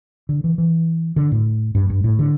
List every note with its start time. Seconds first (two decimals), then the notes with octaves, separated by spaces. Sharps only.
0.29 D3
0.44 E3
0.58 E3
1.16 D3
1.32 A2
1.75 G2
1.90 G2
2.04 A2
2.19 D3